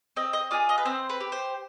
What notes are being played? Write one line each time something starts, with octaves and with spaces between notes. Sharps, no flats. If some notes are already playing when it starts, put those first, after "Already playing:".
C4 D#5
D#5
F4 G#4 D5
D#5
B4
C4 C5
B4
G4
C5